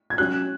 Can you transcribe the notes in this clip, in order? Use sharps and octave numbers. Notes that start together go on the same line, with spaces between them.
G#6
F#3 C#4 F#4 F#6